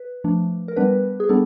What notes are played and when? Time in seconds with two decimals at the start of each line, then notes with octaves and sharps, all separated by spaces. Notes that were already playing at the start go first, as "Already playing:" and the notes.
Already playing: B4
0.24 F3 A3 D4
0.68 A#4
0.76 G3 B3 D4 B4
1.20 G#4
1.29 G3 B3 D4 A4